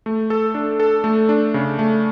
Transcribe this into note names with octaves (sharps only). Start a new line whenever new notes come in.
A3
A4
D4
A4
A3
D4
C#3
A3